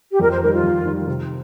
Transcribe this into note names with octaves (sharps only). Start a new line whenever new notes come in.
G4
F2 A#4
C5
D#3 G3 A#4
F4
F2
D#3 G3
C3